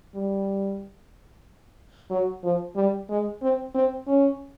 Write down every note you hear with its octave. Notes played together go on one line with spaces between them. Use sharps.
G3
F#3
F3
G3
G#3
C4
C4
C#4